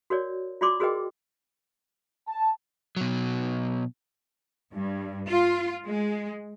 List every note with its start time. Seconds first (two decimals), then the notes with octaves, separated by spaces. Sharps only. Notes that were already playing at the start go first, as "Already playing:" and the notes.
0.10 F#4 A#4 C#5 D5
0.61 F4 F#4 D5 C6 D6
0.80 F#4 G#4 A#4 B4 D#5 G5
2.27 A5
2.96 B2 F#3
4.74 G2
5.28 F4
5.85 G#3